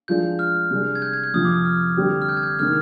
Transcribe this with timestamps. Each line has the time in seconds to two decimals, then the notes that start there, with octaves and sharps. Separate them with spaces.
0.08 F3 G#3 D4 F4 G#4 G6
0.39 F6
0.71 C3 G3 D4 G#4
0.95 G#6
1.02 G6
1.13 G#6
1.24 G6
1.34 F2 C3 F3 D#6
1.45 D6
1.54 D#6
1.65 F6
1.97 D3 G3 C4 G4
2.22 F6
2.29 G6
2.37 G#6
2.43 G6
2.59 C3 D#3 G#3 F6